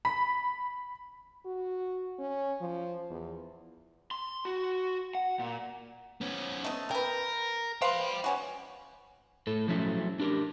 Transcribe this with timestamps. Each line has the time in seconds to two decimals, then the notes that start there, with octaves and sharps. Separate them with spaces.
0.05 B5 B6
1.46 F#4
2.19 C#4
2.61 F3
3.10 E2
4.11 C6
4.45 F#4
5.15 F#5
5.39 A#2
6.21 B3 C#4
6.65 A3 D#5
6.91 A#4 B4 G5
7.82 B4 C5 F5 G5 B5
8.24 B2 C#4 F#4
9.47 A2 A4
9.68 F3 F#3 A3 C#4 E4
10.20 D4 G4 A#4